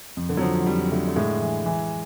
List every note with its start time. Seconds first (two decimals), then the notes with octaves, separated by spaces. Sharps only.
0.17 F2
0.29 D3
0.37 F#3
0.41 D3 F3
0.54 F3
0.66 F2 G3
0.92 D3 A3
1.07 A3
1.16 A2 G#3
1.41 E3
1.66 E3